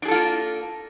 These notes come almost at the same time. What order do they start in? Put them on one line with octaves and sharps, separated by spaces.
D4 G#4 A4 F4 A#3